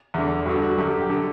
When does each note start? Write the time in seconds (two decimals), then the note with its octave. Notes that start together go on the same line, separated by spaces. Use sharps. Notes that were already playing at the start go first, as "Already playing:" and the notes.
0.14 E2 D3
0.46 G2 D3 F#4
0.62 F#4
0.78 F#2 D3 G4
1.02 G4
1.09 D3 A4